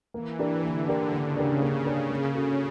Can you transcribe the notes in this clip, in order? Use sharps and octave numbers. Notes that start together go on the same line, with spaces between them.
E3 A#3
D4 G4 A#4
D3 A#3
D4 G4 A#4
C#3 A#3
D4 G4 A#4
A#3
D4 G4 A#4
A#3
C#4 F#4 A4